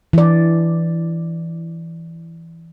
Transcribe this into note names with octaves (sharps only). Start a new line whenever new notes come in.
E3 D5